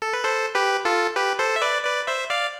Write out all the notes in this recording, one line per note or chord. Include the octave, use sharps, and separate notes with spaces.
A4
B4
A4 C5
G4 B4
F4 A4
G4 B4
A4 C5
E5
B4 D5
B4 D5
C5 E5
D5 F5